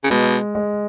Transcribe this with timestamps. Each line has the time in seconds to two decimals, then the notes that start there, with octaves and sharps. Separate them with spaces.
0.04 C#3
0.10 B2 G#3
0.55 G#3